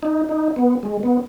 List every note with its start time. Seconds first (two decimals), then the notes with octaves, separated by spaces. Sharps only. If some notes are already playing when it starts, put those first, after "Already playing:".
0.03 D#4
0.29 D#4
0.56 B3
0.83 G#3
1.03 B3